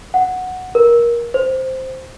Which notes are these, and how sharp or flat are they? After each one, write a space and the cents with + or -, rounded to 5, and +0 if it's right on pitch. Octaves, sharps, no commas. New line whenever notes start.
F#5 -5
A#4 +20
C5 +0